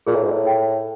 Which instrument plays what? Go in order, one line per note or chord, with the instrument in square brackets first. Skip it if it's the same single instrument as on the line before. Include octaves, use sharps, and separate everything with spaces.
[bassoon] A#2 [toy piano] G#4
[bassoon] A2
G#2
A2
[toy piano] G5